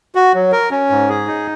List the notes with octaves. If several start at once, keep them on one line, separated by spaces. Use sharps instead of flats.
F#4
F#3
A#4
C#4
G#2
G#4
D#4